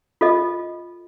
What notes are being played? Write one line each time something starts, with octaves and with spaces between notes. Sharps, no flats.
F4 A4 D#5